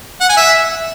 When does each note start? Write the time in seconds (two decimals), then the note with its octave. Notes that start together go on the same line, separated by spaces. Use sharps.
0.21 F#5
0.29 G#5
0.37 E5